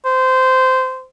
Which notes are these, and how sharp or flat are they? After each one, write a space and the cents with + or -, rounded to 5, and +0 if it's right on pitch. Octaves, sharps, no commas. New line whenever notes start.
C5 -15